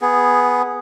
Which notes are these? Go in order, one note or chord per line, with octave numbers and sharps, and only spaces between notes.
B3 G#4